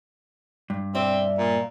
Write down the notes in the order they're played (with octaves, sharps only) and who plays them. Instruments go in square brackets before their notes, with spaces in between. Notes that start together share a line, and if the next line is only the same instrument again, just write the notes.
[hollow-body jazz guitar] G2
[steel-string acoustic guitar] B2 D5 E5 [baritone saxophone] C4
[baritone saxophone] A#2